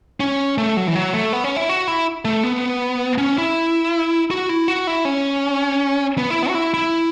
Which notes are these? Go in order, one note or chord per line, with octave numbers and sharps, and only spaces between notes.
C#4
A3
F#3
E3
F#3
A3
B3
C#4
E4
F#4
E4
A3
B3
C#4
E4
F#4
E4
F#4
E4
C#4
B3
E4
B3
F#4
E4
E4